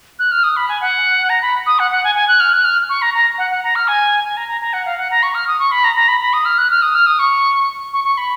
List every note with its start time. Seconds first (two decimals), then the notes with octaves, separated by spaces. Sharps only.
0.19 F#6
0.31 F6
0.44 D#6
0.56 B5
0.69 G#5
0.81 F#5
1.30 A#5
1.42 B5
1.66 D#6
1.79 F#5
1.91 F#5
2.04 G#5
2.15 G#5
2.28 F#6
2.40 F6
2.53 F#6
2.65 F6
2.89 C#6
3.02 A#5
3.14 A#5
3.38 F#5
3.51 F#5
3.63 A#5
3.76 F6
3.88 G#5
4.24 G#5
4.37 A#5
4.49 A#5
4.61 A#5
4.73 F#5
4.85 F5
4.98 F#5
5.11 A#5
5.23 C#6
5.35 F6
5.47 D#6
5.59 C#6
5.72 B5
5.84 A#5
5.96 A#5
6.08 B5
6.21 B5
6.33 D#6
6.45 F6
6.58 F#6
6.70 F6
6.82 D#6
6.95 F6
7.06 D#6
7.19 C#6
7.93 C#6
8.05 C#6
8.18 B5